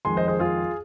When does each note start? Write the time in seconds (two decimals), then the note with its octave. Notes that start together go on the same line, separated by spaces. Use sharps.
0.05 F2 D#3 G#3 G#5 C6
0.17 C5 D#5
0.28 G#4 C5
0.39 F4 G#4